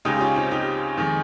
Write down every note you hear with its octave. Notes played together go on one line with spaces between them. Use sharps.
C#2 C#3 G#3 D#4 G4
C#4 F4
C4 D#4
D#4 G4
F2 D#3 G#3